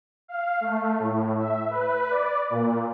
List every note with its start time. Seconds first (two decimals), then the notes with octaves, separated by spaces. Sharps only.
0.28 F5
0.61 A3
0.99 A2
1.39 E5
1.69 B4
2.11 D5
2.50 A#2